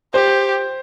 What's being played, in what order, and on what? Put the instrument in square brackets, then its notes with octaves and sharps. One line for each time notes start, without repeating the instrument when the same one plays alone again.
[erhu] G4 [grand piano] C5